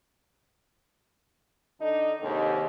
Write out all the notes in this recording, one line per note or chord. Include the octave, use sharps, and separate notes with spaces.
D3 D4 D#4 A4
D#2 G#2 C3 D#3